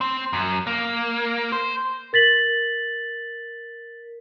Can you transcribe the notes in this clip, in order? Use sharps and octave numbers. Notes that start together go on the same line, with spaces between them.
C4
F#2
A#3
C5
A#4 A6 B6 F#7